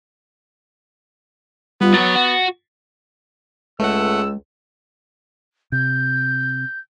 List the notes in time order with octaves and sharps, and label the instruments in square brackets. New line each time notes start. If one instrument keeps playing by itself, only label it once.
[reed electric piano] G3 F4 [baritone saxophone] B3
[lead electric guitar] F#3 C#5 [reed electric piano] A6
[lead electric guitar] F#4
[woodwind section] C#2 [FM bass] G#3 [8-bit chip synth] A3 F#5 [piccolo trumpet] E6
[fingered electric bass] C3 [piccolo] G6